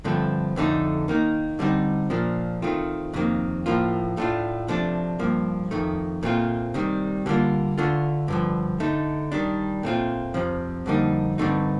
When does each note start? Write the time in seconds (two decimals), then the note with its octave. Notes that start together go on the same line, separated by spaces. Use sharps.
0.04 G2 D3 F3 A3 C4
0.56 F2 D3 A3 D#4
1.08 D#3 A#3 D#4
1.59 D3 G3 C4 D#4
2.10 A#2 F3 A#3 D4
2.62 D#3 A3 C4 F4
3.14 F2 C3 D#3 A#3
3.66 A2 F3 A#3 F4
4.17 A2 A3 D4 F4
4.68 C3 F3 A3 D4
5.19 G2 F3 A#3
5.71 F2 D#3 A3
6.23 A#2 A3 C4 F4
6.74 C3 D#3 G3
7.26 D3 G3 A#3 F4
7.78 D3 A3 D4 F4
8.28 G2 D3 F3
8.80 D3 A3 D#4
9.32 D#3 G3 D4
9.83 A#2 A3 C4 F4
10.34 F2 C3 F3
10.86 F2 D3 G3 A#3 D#4
11.38 G2 D3 A3 C4 D#4